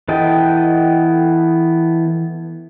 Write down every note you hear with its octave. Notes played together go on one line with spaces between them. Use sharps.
E3 B3 A4 D#5 G5